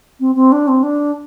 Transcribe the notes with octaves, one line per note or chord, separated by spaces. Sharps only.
C4
C4
D4
C4
D4